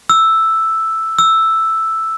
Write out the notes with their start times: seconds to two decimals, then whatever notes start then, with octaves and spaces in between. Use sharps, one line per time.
0.09 E6
1.19 E6